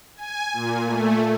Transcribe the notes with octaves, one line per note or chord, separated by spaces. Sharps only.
G#5
A#2
A3